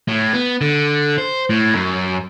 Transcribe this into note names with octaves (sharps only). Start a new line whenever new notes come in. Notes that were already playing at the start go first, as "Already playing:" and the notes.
A2
B3
D3
C5
A2
F#2